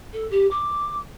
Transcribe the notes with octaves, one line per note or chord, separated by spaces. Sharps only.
A4
G4
D6